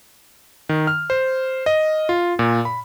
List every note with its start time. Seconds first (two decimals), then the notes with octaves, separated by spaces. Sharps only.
0.69 D#3
0.87 F6
1.10 C5
1.66 D#5
2.09 F4
2.39 A#2
2.65 B5